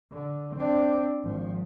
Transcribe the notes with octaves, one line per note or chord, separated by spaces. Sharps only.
D3
C4 D4
G#1 F3